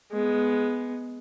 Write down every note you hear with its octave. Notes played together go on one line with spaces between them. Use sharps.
G#3 B3